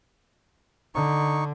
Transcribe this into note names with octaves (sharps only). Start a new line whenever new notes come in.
D3 D#4 C#6